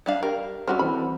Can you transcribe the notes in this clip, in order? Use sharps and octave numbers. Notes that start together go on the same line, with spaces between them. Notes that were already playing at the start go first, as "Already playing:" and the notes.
G3 D4 F5
G3 A#4
G3 C#4 F#4 C5 E6 F6
E3 C4 A4 B5